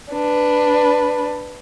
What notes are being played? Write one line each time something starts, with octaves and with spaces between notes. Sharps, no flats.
D4 B4